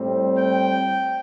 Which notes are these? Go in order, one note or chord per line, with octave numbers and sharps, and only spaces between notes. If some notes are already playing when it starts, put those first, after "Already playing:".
Already playing: A2 G3 C4
G5